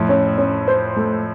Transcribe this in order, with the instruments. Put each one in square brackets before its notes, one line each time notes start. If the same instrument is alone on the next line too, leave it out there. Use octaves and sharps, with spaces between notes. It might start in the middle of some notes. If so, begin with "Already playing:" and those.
Already playing: [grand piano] F2 A2 [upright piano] A3
[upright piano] C#4
C#4
C5
A3